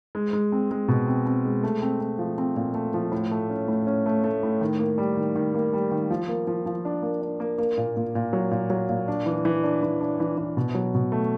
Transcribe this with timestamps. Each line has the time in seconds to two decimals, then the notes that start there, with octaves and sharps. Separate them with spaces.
0.15 G#3
0.33 G#3
0.52 C4
0.71 G#3
0.88 B2
1.07 C4
1.26 C4
1.45 G#3
1.63 A3
1.82 C4
2.00 C4
2.19 F3
2.38 C4
2.56 A#2
2.74 A3
2.94 F3
3.12 A2
3.31 A3
3.50 C#4
3.68 A2
3.87 C#4
4.06 A3
4.24 A3
4.43 A2
4.61 D#3
4.79 A#3
4.98 G3
5.17 D#3
5.36 D#3
5.54 A#3
5.73 G3
5.92 D#3
6.10 F3
6.28 A#3
6.47 F3
6.66 F3
6.85 D4
7.02 A#3
7.22 D4
7.40 A#3
7.58 A#3
7.78 A#2
7.97 A#2
8.15 A#2
8.33 F#3
8.51 A#2
8.70 F#3
8.89 A#2
9.08 D4
9.26 E3
9.45 E3
9.63 D4
9.83 E3
10.01 D4
10.20 E3
10.37 E3
10.57 B2
10.75 F#3
10.94 B2
11.12 A3